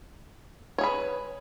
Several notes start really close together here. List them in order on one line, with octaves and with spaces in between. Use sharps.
C#5 G#4 B4